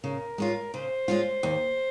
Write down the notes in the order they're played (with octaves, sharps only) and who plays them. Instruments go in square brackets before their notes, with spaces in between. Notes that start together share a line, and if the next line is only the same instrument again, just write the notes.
[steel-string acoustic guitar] C#3 [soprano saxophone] A#4
[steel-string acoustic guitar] G#3 C#4 F4
[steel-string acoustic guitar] C#3 [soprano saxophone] C5
[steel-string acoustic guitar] G#3 C#4 F4
D#2